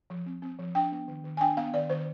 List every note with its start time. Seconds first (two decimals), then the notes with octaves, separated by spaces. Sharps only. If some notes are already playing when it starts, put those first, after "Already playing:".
0.10 F3
0.26 C4
0.42 C4
0.59 F3
0.75 D4 G5
0.92 B3
1.08 D#3
1.24 D#3
1.37 G#5
1.41 D4 G5
1.57 B3 F5
1.74 D#3 D5
1.90 D#3 C5